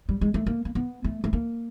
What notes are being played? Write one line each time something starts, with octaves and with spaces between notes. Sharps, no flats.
G3
G#3
A3
A#3
A#3
B3
A3
A3
A#3